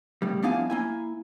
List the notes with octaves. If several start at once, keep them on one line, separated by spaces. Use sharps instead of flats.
A2 C#3 G3
F2 B3 D4 E4 F5 G#5
A#3 E4 G#5